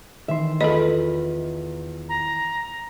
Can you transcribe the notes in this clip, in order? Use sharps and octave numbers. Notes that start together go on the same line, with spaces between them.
D#3 E3 E5 C6
E2 F4 A4 B4 D#5
A#5